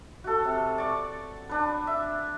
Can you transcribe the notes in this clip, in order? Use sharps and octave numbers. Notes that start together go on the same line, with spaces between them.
F#4 A4
C3
D5 C#6
D4 B4
E5